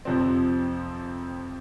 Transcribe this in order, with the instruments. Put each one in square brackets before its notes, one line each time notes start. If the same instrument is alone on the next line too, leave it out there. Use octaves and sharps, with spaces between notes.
[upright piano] F2 C3 F3 C4